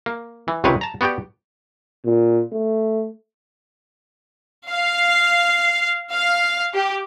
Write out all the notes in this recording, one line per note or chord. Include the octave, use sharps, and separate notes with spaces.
A#3
E3
C#2 C3 D#3 C4 B4 C#5
A5 A#5
B3 F#4 G4 D5 G5
A#2
A3
F5
F5
G4